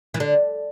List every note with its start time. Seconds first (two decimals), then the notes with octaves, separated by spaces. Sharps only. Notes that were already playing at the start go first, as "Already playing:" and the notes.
0.14 E3
0.20 D3